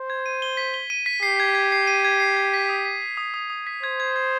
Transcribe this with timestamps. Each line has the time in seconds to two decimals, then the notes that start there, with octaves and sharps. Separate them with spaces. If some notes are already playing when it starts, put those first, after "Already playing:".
Already playing: C5
0.10 G#6
0.26 D#7
0.42 G7
0.57 B6
0.74 G7
0.90 D#7
1.06 B6
1.22 G4 C7
1.40 G#6
1.55 G#6
1.72 C7
1.87 D#7
2.05 G#6
2.20 C7
2.37 G#6
2.54 B6
2.69 D#6
2.85 B6
3.02 B6
3.17 D#6
3.34 D#6
3.50 D#6
3.67 B6
3.83 C5 G#6
4.00 G#6
4.16 G#6